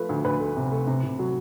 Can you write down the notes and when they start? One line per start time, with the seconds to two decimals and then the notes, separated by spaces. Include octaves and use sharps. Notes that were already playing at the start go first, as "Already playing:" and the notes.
Already playing: F3 A3 B4
0.09 D2
0.25 D2 B4
0.40 A3
0.57 C3
0.72 A3
0.87 C3
1.04 C3
1.19 F#3